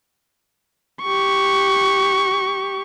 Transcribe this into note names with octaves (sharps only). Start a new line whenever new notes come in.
G4 C#6